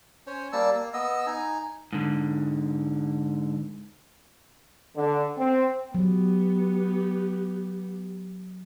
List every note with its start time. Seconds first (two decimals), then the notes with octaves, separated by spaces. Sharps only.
0.27 C#4 C5 C#5 G#5
0.53 G3 A#3 A5 E6
0.76 A#3
0.93 B3 D#5 E6
1.26 D#4 G#5
1.93 G#2 D3
4.96 D3
5.37 C4
5.95 F#3 B3 G4